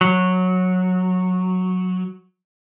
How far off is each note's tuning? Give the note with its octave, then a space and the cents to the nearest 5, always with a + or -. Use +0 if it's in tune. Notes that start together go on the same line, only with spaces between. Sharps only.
F#3 -10